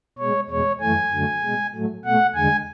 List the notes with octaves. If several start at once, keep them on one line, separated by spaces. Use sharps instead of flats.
B2 G#3 C#5
E2 B2 G#3 C#5
F#2 E3 A3 G#5
F#2 D3 F#3 A3
B2 G#3
A2 F#3 A3
B2 A3 F#5
E2 D3 G#3 G#5